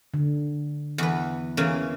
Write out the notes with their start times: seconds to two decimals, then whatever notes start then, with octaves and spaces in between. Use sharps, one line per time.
0.14 D3
0.98 E2 B4
1.57 C#3 E3 A#3